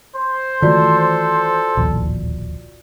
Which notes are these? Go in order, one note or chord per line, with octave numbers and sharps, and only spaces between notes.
C5
D#3 E3 A3 F4 F#4 A4 D5
D1 A#1 D#2